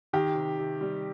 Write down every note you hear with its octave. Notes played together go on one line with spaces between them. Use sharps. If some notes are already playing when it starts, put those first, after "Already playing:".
D#3 G4
C3
C3
G3